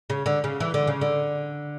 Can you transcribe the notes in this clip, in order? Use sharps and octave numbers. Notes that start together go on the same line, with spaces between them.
C#3
D3
C#3
E3
D3
C#3
D3